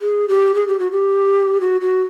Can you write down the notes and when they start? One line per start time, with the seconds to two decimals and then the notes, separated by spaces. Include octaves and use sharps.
0.02 G#4
0.28 G4
0.55 G#4
0.68 G4
0.79 F#4
0.91 G4
1.61 F#4
1.81 F#4